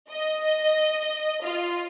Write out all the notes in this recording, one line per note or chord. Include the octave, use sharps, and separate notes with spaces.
D#5
F4